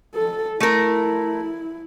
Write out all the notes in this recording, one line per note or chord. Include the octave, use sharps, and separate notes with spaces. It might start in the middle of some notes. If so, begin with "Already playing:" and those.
A4
A3 E4 A#4